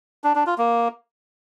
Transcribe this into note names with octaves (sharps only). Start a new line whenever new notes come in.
D4
D4
F4
A#3